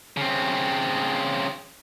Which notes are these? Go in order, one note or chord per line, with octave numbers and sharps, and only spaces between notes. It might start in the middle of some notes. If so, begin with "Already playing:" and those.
C#3 C4